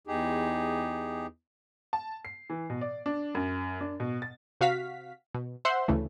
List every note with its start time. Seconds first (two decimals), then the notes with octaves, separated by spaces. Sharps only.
0.07 E2 D#4 G4 G#4
1.93 A5
2.25 C7
2.50 E3
2.70 B2
2.81 D5
3.06 D4
3.35 F#2
3.81 D4
4.00 B2
4.22 A6
4.61 C3 F#4 F5 B6
5.34 B2
5.65 C5 E5 F#5 C6
5.88 D2 C#3 E3 A3